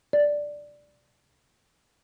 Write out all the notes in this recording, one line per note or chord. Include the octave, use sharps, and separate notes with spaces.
D5